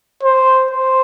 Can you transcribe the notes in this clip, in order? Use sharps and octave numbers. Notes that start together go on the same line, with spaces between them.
C5
C5